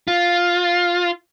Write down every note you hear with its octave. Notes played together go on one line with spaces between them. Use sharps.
F4